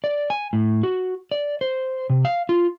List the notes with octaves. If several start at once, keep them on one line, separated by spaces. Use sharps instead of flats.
D5
G#5
A2
F#4
D5
C5
C3
F5
F4